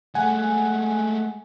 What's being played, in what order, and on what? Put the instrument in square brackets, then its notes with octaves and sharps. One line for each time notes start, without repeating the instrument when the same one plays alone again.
[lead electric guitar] G#3 A3 [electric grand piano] F#5 G#5